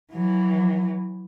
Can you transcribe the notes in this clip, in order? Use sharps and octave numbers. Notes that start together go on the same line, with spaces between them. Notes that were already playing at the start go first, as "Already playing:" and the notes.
E3 F#3